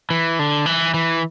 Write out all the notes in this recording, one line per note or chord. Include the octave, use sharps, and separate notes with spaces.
E3
D3
E3
E3